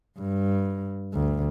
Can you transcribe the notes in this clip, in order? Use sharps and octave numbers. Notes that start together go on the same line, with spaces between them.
G2
D2